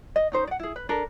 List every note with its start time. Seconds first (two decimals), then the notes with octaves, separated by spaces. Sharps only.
0.16 D#5
0.32 C#4 D#4 C5
0.47 D5 F#5
0.59 E4 G#4
0.76 B4
0.89 D4 A4 A#4